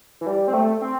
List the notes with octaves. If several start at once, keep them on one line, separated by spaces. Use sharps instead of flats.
E3
G3
C4
A3
C4